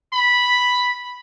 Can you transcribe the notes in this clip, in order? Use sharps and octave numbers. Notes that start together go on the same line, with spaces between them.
B5